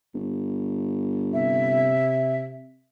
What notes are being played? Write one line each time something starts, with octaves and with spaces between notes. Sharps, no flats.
G1
C3 E5